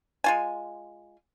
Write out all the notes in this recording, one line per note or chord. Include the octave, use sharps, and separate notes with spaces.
G#3 F4 G#5